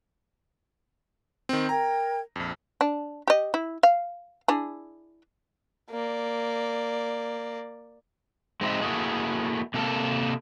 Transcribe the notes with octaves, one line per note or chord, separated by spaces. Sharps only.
D#3 C4
A#4 G5 A#5 G#6
A#1 F2
D4
G4 D#5
E4
F5
D4 E4 G#4
A#3 D5
G#3 C4 D#4 G4 D5 E5
A3 A#3 E4 F#4 G#4
C3 A#3 A4 A#4